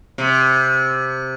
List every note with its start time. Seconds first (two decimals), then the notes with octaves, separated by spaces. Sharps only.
0.18 C3